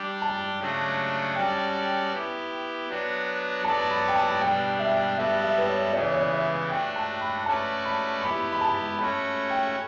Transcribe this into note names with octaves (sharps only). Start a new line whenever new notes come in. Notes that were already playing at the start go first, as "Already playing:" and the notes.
Already playing: G3 D4 G4
A5
C#3 F#3 A3 D4 F#4
G3 C#4 F#4 A4 D5 G5
B3 E4 G4
F#3 B3 D4 F#4
F#3 B3 F#4 A4 D5 A5
B5
G5
A5
B2 G3 D4 G5
E5
G3 B3 F#4 A4 E5
E5
B4
C#5
C#3 E3 B3 D5
C#5
D5
E5
A3 D4 F#4 G5
A5
B5
A3 C#4 F#4 B4 D5 A5
B5
B3 E4 G4 B5
B5
A5
A3 C#4 F#4 C#5 B5
G5